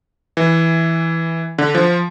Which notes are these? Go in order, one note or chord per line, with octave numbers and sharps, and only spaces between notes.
E3
D3
F3